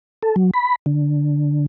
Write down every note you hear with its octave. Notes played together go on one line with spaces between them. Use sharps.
A4
F#3
B5
D3